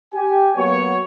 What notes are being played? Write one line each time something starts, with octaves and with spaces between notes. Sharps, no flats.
G4 G#5
F#3 A#3 B3 F#4 C#5